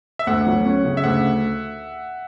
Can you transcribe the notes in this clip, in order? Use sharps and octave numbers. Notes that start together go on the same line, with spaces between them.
E5
D2 F#5
F#3
C#4
C#3
E5
D2 F#5